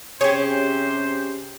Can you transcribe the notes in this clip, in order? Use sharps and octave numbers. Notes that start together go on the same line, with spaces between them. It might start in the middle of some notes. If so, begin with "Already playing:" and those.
C3 C#4 G4 G#4 C5 C#5